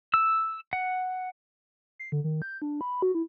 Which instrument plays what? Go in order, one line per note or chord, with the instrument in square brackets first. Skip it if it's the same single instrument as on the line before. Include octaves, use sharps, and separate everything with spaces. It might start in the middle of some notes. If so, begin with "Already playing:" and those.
[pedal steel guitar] E6
F#5
[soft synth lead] C7
D3
D#3
G6
D4
B5
F#4
E4